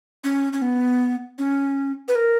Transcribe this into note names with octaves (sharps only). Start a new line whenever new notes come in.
C#4
C#4
B3
C#4
B4
A#4